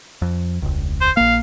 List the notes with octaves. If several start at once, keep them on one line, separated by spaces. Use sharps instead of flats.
F2
E1 C#2
C5
A#1 A#3 F5